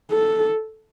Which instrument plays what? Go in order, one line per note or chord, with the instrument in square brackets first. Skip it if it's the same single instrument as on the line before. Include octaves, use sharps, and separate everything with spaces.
[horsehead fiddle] A4